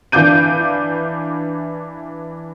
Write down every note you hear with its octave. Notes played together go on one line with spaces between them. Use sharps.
E3 D4 F5 D6 G6 D#7